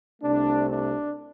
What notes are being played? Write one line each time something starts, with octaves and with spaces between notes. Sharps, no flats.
C2 C3 A3 D4
D4